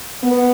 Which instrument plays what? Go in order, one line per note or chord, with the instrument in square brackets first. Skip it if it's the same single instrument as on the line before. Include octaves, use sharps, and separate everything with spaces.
[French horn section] B3